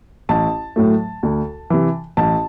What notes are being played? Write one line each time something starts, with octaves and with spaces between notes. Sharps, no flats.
A1 A5
A2 F#3 A3
D2
C3 E3
A1 A5